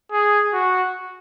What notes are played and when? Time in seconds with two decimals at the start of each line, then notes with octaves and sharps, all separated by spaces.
0.12 G#4
0.53 F#4